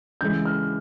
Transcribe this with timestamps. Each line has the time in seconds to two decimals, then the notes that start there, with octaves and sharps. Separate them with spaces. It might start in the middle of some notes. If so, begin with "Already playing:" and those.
0.21 C#3 E3 G#3 G6
0.45 F6